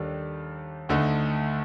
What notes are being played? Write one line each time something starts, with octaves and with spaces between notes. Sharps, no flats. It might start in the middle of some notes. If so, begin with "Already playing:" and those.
Already playing: D#2 D#3 G3 D4 A4
D2 D3 A3 D#4